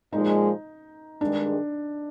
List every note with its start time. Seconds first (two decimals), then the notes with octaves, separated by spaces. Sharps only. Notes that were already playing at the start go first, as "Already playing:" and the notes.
0.13 A#2 F3 G#3 D#4
1.21 G2 D#3 G#3 D4